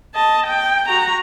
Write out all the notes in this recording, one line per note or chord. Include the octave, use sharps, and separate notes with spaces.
D#5 A5
G5
F#4 A#5